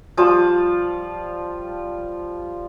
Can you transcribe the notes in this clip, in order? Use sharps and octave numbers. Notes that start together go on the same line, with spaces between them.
F3 G3 F4 A5